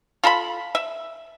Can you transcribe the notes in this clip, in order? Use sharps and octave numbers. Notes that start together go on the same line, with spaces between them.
F4 A4 A#5 B5
E5